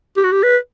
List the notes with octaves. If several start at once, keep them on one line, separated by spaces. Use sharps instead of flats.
G4
F#4
G4
B4